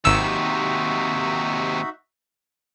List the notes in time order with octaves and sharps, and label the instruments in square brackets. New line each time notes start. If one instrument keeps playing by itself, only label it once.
[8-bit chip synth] G#1 E6 [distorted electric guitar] D#2 C3 [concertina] D#4 F#4 E5